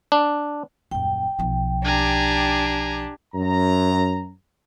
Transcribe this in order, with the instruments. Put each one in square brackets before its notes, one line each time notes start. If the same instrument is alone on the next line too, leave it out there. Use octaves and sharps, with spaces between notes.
[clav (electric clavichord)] D4
[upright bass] D#1 F#2 [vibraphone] G5
[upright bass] B1 F3
[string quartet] D4 G4 [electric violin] G#5 A#5
[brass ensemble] F#2 A#5